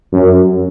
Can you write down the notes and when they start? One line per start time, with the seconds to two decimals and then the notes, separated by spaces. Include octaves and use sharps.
0.13 F#2